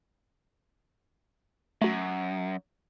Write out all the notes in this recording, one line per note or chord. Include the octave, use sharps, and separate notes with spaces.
F#2 A3 F#4